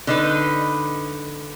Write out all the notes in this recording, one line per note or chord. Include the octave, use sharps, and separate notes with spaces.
D3 D#4 B4